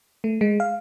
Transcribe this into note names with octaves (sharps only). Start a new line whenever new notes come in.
A3
G#3
F5